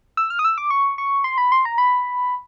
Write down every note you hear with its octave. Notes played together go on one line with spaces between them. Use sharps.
E6
F6
D#6
E6
D6
C#6
C#6
C6
B5
C6
A#5
B5